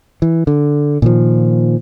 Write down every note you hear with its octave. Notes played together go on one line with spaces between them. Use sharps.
E3
D3
A#2 D#3 F3